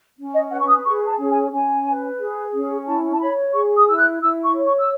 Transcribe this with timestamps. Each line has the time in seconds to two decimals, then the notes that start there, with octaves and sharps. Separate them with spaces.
0.18 C#4
0.34 D#5
0.51 B4 F#5
0.60 C#6
0.68 D#6
0.84 G#4 C#6
1.07 A5
1.18 C#4
1.30 G#5
1.52 C#4 G#5
1.85 B4
2.20 G#4
2.53 C#4
2.86 E4 A5
3.13 A5
3.20 C#5 B5
3.53 G#4 C#6
3.76 D#6
3.88 E4 E6
3.98 F#6
4.21 E4 E6
4.44 C#6
4.54 C#5
4.65 C#6
4.79 E6